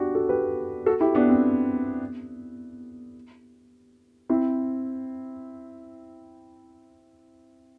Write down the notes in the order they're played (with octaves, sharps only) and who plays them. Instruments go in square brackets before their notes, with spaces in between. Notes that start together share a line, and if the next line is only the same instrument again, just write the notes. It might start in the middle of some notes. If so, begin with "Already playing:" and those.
Already playing: [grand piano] D4 F#4 G4
F#4 A4
G4 B4
F#4 A4
E4 G4
B3 D4
C4
C4 E4